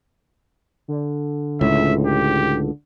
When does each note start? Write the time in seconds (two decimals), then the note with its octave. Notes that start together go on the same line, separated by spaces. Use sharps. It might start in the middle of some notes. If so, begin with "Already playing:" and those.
0.88 D3
1.61 C#2 A2 E5
2.06 G4